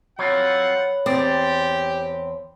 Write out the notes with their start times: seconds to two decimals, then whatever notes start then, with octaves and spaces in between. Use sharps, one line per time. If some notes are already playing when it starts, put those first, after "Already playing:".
0.19 F#3 C4 F4 C#5 F#5 B5
1.06 E2 C4 G4 D5